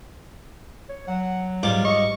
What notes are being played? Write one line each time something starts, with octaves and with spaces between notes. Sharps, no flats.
C#5
F#3 F#5
G#2 G3 F4 D6
D#5 C#6